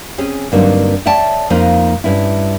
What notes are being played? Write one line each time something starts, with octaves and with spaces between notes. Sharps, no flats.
C4 C#4 G#4
G2 D3 F#3 A#3 C4 D#4
C#5 D5 E5 G5 A5
F2 A#3 D#4 C5
G2 C#4 E4